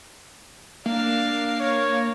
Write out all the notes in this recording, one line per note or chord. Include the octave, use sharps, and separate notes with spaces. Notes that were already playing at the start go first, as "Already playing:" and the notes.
A#3 D4 F5
C#5